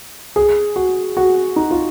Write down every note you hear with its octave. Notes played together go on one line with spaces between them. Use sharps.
G#4
F#4
F#4
D#4
F4